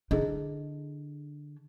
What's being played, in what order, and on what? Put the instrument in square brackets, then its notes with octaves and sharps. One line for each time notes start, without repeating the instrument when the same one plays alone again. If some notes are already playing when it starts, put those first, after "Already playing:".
[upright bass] D3 D4 [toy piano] E4 G#4 D#5